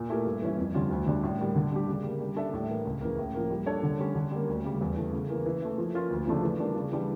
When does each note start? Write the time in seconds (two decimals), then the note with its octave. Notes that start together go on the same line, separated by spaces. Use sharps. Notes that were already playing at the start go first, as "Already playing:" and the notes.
Already playing: A#2
0.09 A3 E4 G4 A#4
0.26 G2
0.42 E3 G3 C#4 E4
0.58 F2
0.74 D3 G3 C#4 F4
0.91 D2
1.06 D3 G3 D4
1.23 A2
1.39 G3 A#3
1.56 D3
1.72 G3 D4 G4
1.88 C#3
2.04 G3 A#3
2.20 G3
2.36 D4 A4 E5
2.53 A2
2.69 E3 A#3
2.85 C#2
3.01 C#3 E3 A#3
3.18 A2
3.35 F3 A#3
3.50 G3
3.66 D4 A4 C#5
3.83 D3
4.00 G3 C#4
4.15 D3
4.31 G3 A#3
4.48 D2
4.64 C#3 G3
4.81 E2
4.96 E3 A3
5.13 C#3
5.29 E3 A#3
5.46 E3
5.62 A3 E4
5.78 F3
5.94 A#3 C#4 F4
6.10 D2
6.27 C#3 F3 A3 D4
6.43 E3
6.59 G3 A#3 D4
6.75 C#3
6.91 E3 G3 D4